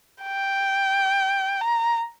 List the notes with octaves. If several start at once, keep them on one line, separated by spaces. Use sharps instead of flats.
G5
A#5